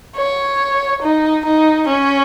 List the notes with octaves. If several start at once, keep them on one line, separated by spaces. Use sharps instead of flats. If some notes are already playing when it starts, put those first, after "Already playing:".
C#5
D#4
D#4
C#4